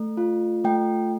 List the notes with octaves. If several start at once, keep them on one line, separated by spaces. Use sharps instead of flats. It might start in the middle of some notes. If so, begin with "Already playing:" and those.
Already playing: A3
F4
A3 G5